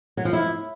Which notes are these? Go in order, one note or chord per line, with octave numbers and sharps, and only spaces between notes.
F#3
F3
E4